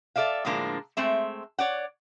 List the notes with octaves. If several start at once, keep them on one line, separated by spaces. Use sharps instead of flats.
A4 D5 E5 F5
A2 D3 F3 G#3 A#3 D4
G#3 A3 C4 E5
C#5 D5 F#5